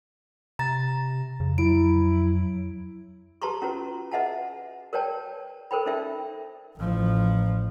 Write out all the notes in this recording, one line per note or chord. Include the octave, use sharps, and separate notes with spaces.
C3 A#5 A6
F2 C#3
F#3 E4 D7
G4 B4 A5 A#5 C6 C#6
C#4 F4 F#4 B4
B4 D#5 E5 F#5 G#5 A5
A#4 B4 C#5 D5 G5 A5
A4 A#4 C5 G5 B5
C#4 D#4 D5 E5 G5
A1 F3